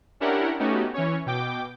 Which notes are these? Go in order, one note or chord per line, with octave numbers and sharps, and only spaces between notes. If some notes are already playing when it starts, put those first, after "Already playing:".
C#4 D4 E4 G4 A#4 F#5
A3 B3 C#4 D#4 F#4 G4
E3 C#4 C#5
B2 G5 D6